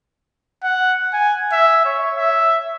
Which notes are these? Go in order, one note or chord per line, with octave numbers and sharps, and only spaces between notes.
F#5
G#5
E5
C#5
E5